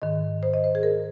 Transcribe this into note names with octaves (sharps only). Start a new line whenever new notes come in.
G#2 D#3 D#5
C5
D#5
C5
G#4
A#4